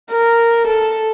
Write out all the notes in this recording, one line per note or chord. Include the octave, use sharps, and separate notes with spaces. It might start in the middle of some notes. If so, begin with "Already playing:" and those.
A#4
A4